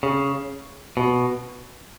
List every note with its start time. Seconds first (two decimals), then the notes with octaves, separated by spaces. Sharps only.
0.03 C#3
0.97 B2